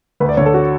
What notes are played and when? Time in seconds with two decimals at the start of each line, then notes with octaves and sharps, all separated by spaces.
0.20 D2 B4
0.29 D5
0.37 D3 C#5
0.46 A4
0.54 F#4